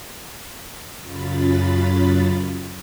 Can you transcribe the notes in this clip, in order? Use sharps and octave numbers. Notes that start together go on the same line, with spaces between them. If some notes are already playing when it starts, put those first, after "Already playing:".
F#2 C#3 F#3 F4 B5 A6